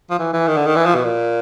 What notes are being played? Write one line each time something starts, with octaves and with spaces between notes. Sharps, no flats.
F3
E3
E3
D#3
D3
D#3
E3
F3
B2
A#2